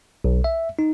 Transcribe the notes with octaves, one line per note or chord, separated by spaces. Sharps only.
B1
E5
D#4